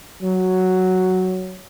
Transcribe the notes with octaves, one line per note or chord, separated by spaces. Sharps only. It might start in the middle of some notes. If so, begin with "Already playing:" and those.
F#3